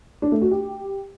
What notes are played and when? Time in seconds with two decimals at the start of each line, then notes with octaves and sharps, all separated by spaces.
0.22 D4
0.32 A3
0.42 F#4
0.51 G4